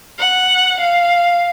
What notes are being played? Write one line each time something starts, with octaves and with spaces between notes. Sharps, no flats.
F#5
F5